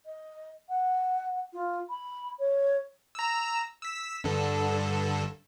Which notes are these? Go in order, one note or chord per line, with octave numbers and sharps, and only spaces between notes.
D#5
F#5
F4
B5
C#5
A#5 E6
E6 B6
G2 D3 A4